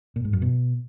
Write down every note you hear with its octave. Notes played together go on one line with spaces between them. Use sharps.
A#2
G#2
F#2
B2